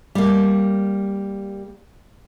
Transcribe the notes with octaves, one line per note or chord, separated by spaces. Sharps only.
G3 A#3